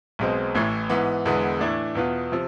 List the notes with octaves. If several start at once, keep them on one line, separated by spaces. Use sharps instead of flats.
B1 B2 G#3 C4
A1 A2 E3
G#2 E3 B3
E1 E2 D3 G#3 B3
A2 E3 A3 D4
E2 B2 B3 F4
C3 F3